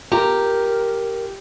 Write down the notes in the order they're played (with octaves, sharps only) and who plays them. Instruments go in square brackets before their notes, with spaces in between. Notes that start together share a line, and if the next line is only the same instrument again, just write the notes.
[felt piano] F4 [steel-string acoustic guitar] G4 [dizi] A#4 [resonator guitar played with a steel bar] A#5